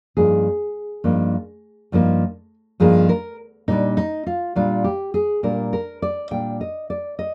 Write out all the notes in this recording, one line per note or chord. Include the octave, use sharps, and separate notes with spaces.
G2 F3 A#3 D#4 G#4
G2 F3 A#3 D#4
G2 F3 A#3 D#4
G2 F3 A#3 D#4 G#4
A#4
A#2 G3 D4 D#4
D#4
F4
A#2 G3 D4 F4
G4
G#4
A#2 G3 D4 A#4
A#4
D5
A#2 G3 D4 G5
D#5
D5
D#5